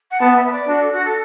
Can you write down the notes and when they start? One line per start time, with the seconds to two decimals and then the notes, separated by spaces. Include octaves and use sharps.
0.11 F#5
0.20 B3 A5
0.36 E5
0.46 B4
0.52 D5
0.67 D4 F#4
0.81 A4
0.92 F#4
1.05 A4